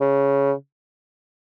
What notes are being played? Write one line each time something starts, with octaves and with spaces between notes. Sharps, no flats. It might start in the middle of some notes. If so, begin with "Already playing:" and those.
C#3